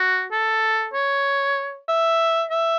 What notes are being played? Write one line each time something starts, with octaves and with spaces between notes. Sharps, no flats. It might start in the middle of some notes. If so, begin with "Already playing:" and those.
Already playing: F#4
A4
C#5
E5
E5